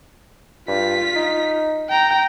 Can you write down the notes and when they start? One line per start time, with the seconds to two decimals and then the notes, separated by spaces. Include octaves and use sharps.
0.68 G2 F4 B6
1.16 D#4
1.89 G5 A#5